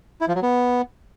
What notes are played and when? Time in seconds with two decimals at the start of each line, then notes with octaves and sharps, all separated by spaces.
0.21 E4
0.28 F3
0.35 F#3
0.43 B3